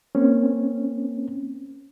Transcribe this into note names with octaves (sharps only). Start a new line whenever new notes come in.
A#3 C4 C#4